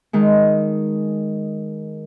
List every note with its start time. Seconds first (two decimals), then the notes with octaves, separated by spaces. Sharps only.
0.13 D#3 G#3